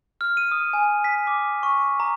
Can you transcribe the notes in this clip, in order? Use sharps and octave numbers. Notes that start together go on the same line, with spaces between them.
F6
D#7
D#6
G#5
B6
D6
C#6
A#5